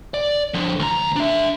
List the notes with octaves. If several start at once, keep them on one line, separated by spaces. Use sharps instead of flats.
D5
D3 F3
D2 A#5
D4 E5